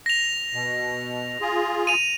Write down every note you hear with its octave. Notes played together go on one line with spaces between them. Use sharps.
A#6 F7
B2
F4 G#4
D#7 F7